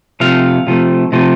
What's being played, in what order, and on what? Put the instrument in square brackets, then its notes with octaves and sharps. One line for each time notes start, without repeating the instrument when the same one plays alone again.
[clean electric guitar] C3 F3 A3 F5
C3 F3 A3
C3 F3 A3